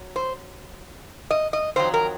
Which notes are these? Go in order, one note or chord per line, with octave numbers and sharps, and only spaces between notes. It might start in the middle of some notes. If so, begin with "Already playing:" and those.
Already playing: F#3
C5
D#5
D#5
F2 D#3 F#3 C5
A#4